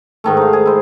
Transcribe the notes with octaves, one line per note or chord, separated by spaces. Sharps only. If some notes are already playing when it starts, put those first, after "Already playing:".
G#2 D#3 A3
D#4 F5
G#4
E4 C5